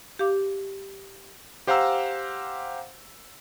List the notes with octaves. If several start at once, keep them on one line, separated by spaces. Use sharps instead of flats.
G4 F5 D6
G4 C5 F5 F#5 A#5 E6